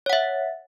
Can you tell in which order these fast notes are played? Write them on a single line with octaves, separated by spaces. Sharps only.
C#5 F#5 E5